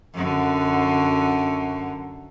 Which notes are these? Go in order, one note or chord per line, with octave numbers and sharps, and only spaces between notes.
F#2 D3